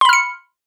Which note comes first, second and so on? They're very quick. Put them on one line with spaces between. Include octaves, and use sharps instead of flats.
C6 B5 F6 C#7